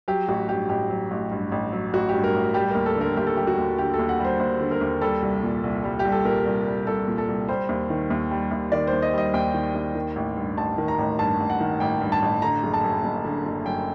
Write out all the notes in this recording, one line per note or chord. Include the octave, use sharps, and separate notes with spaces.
F#3 G4
A1 F#4
G2 G4
A1 G4
F#3
A1
G2
A1
F#3
A1 F#4
G4
G2
A#4
A1
G3 G4
D#2 A#4
A4
D3 A#4
D#2 G4
A4
G3 G4
F#4
D#2
D3 G4
A4
D#2
F#5
G3
C5
D#2 C5
D3
A#4
D#2
G3 A4
C2
A#2
C2
G3
G4
C2
A4
A#2 A#4
C2
G3
C2 A4
A#2
A4
C2
G3 C5
D#2
D#3
D#2
G3
D#2
D#3 D5
C5
D#2
D#5
G3 D#5
D#2 G5
D#3
D#2
D#3
A1
G2
A1 A5
D#3
A#5
A1
G2 A5
A1
F#5
D#3
A1 G5
G2
A5
A1
D3 A#5
F#1
A5
F#2
F#1
D3
F#1
F#2 G5